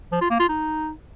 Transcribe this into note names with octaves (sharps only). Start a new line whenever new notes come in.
F3
F4
A#3
F4
D#4